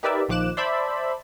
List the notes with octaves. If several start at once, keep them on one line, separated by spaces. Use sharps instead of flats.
D#4 G4 A#4 B4 D5 E5
A#1 D#3 F3 D6 F#6 E7
C5 D5 E5 A5 B5